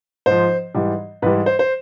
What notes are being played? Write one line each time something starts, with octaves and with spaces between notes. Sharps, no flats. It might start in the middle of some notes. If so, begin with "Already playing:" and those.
G#2 F3 C5
G#2 E3 G3
G#2 E3 G3 B4
C5
C5